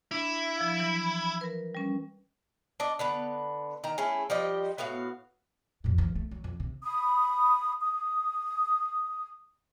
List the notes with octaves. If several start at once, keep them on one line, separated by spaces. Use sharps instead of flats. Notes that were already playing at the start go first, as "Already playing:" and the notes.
D4 E4
F3 F5
E3 F#3
A#4 B4
G3 C#4
D4 D5 D#5
D3 B3 B4
D#3 A#5
A3 C#4 E4 G#4
F3 G3 G4 D#5
A2 B3 F#4 F5
F2 A2
F3
A3
F#3
F2
C3
B5 D#6
D#6